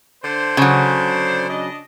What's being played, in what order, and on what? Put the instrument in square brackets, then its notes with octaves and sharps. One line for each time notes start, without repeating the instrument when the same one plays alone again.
[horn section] D3 D4 C5
[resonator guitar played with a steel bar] C#3 F#3
[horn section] D4 D#5